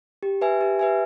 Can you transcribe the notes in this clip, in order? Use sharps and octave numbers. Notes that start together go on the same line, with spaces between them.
G4
B4 E5 G#5
G4
B4 E5 G#5